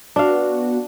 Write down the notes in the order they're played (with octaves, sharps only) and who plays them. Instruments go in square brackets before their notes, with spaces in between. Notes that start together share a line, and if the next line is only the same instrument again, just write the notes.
[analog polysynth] B3 F#4 [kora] D4 F5